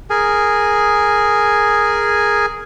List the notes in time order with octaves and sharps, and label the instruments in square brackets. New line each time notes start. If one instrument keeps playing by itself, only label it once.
[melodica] G#4 A#4 G#5